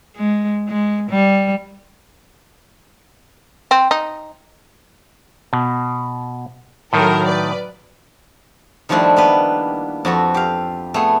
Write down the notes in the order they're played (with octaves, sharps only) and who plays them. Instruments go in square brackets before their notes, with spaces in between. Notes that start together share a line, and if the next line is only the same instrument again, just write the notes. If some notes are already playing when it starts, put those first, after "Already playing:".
[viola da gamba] G#3
G#3
G3
[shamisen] C4
D#4
[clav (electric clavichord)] B2
[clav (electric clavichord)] A2 D#3 [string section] F#3 A4 A#4
[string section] B4 D5
[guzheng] D#3 F3 G3 A3 D4 E4
A#3 B3 B4
F2 F#4 A4
G4 F5
A3 B3 G#4